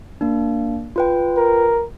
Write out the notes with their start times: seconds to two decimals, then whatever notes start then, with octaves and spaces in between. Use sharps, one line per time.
0.21 A#3 D4
0.96 F4 B4 G5
1.37 A#4